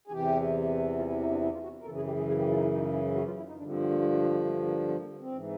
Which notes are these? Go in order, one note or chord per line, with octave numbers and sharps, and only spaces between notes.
G#4
E2 C3 E3 G4
F4
E4
D#4
D4
E4
F4
F#4
A#4
F#2 C#3 E3 A4
G#4
G4
G#4
G#4
G4
F4
D#4
E4
D#4
E4
F#4
F4
E4
D#4
G2 D3 F3 D4
C4
B3
A#3
G#3
A3
G#3
G#3
A3
A#3
B3
A#3
C4
G#2 E3